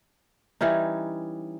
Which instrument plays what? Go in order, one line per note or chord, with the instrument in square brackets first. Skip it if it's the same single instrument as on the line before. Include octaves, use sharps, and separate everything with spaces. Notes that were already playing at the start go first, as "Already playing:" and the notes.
[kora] E3 G3 C#4 D#4